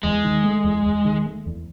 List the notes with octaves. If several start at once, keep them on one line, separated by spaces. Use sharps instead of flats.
E2 G#3
D#3
A3
E2
E2
D#3
A3
E2